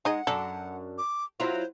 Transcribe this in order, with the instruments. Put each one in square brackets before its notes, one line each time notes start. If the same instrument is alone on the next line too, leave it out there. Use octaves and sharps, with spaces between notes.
[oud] G#3 [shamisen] D#4 G#4 D#5 [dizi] F#5
[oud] F#2 D4 [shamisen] A4
[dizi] D6
[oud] F#3 E4 F4 [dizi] C5